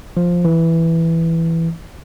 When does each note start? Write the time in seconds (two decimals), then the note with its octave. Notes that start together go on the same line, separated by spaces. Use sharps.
0.17 F3
0.45 E3